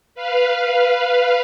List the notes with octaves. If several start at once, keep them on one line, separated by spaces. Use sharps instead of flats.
B4 F5